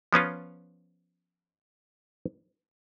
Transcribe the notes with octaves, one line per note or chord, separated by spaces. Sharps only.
F3 B3 C#4 F4